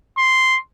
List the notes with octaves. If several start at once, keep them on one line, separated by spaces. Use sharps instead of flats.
C6